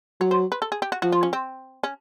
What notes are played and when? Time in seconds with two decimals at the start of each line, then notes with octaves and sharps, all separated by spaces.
0.20 F#3 C#5
0.31 C5
0.52 B4
0.62 A4
0.72 G#4
0.82 G4
0.92 F#4
1.02 F3 F#4
1.12 F4
1.23 C#4
1.33 C4
1.84 C#4